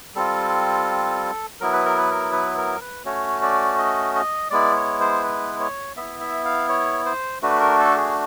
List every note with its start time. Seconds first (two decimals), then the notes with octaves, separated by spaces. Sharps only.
0.15 G3 C4 F4 A4
1.60 F#3 B3 E4 A#4
1.73 B4
1.85 A#4
1.98 B4
2.10 A#4
2.32 B4
2.58 A#4
2.81 B4
3.05 A3 C#4 F#4 C#5
3.42 D5
3.78 D#5
4.15 D#5
4.51 G#3 B3 E4 D5
4.76 C#5
5.00 C5
5.23 B4
5.60 C#5
5.96 B3 E4 E5
6.21 E5
6.45 F5
6.69 C#5
7.06 C5
7.42 A3 D4 F#4 B4
7.60 A#4
7.79 A4
7.97 G#4